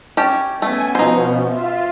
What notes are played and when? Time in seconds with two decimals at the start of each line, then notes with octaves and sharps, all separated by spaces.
0.17 C#4 G4 A5
0.62 A3 B3 C#4 G#5
0.95 B2 F3 D#4 C5
1.50 F4 E5